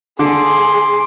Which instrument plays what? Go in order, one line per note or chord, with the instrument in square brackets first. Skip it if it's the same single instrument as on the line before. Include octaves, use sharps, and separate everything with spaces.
[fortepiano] D3 [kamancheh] G#4 [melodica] C6 D6